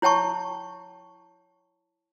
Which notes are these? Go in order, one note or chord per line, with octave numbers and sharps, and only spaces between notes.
E4 C#5 G5 A5 C#6